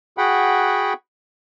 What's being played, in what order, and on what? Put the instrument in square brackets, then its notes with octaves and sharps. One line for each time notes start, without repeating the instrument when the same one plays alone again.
[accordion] F#4 G#4 F#5 G5 B5